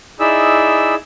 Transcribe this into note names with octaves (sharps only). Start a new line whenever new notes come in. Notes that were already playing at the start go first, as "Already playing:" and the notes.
D#4 E4 G#4 D5 E5 E6